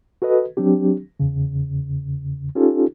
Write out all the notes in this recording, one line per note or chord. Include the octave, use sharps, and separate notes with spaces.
F#4 A4 B4 D#5
F#3 C4 D4 G4
E2 C#3
C#4 D#4 F4 G4 A4